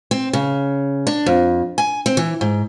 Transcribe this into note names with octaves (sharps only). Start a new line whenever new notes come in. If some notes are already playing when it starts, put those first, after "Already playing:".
C4
C#3
D4
F2
G#5
C4
E3
G#2